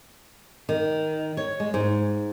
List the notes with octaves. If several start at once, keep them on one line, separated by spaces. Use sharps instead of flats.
D#3
C#5
G#3
G#2